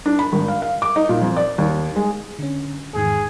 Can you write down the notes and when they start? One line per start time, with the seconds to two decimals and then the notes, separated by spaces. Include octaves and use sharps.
0.06 D4
0.19 B5
0.32 G#1
0.48 F5
0.62 F5
0.82 D6
0.96 D#4
1.09 A#2
1.22 F2
1.37 D5
1.58 D#2
1.96 G#3
2.39 D3 C#4
2.95 E2 G#2 D#3 G#4